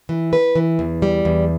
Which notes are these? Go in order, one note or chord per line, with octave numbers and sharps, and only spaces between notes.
E3
B4
E3
E2
G3
E2